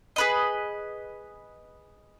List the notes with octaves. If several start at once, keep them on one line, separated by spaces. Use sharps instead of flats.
G#4 B4 D#5